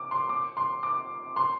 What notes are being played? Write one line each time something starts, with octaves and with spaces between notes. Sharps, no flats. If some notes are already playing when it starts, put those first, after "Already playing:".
Already playing: D6
C6
D6
C6
D6
C6